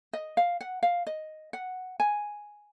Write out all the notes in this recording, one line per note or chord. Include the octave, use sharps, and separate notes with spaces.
D#5
F5
F#5
F5
D#5
F#5
G#5